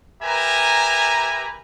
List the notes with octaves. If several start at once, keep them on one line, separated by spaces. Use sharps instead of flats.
G4 A#4 B4 E5 G#5 A#5